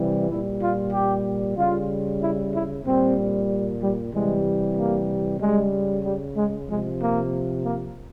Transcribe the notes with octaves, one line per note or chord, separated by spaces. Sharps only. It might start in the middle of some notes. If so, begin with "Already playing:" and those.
Already playing: C3 E3 G3
A#2 G3 E4
F4
G4
C#3 G3 F4
E4
E4
A#2 G3 C4
G3
C3 E3 G3 G#3
A#3
C#3 G3 G#3
G3
G#3
C3 F3 G#3
A#3
A#3